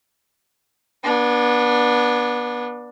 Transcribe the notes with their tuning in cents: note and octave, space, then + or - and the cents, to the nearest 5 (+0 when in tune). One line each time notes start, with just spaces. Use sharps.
B3 -30 D4 +5